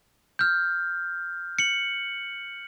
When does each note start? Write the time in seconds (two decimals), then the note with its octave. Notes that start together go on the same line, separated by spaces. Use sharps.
0.39 F6 G6
1.59 C#7 F#7